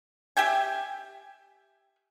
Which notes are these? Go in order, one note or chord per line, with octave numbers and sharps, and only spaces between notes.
G4 E5 G5 G#5